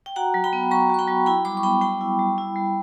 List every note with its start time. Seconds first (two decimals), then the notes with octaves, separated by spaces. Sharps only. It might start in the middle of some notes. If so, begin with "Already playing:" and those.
0.06 G5
0.16 F#4 F#5 A#5
0.34 F#3
0.44 G5 B5
0.53 B3
0.71 F#3 A#5 C#6
0.90 F#4 C#6
0.99 G5 B5
1.08 F#3
1.26 E4 G5 B5
1.45 G3 B5 D6
1.57 C#6
1.63 B3 G5 B5
1.81 G3 G5 B5
2.01 E4
2.19 G3
2.38 E4
2.56 G3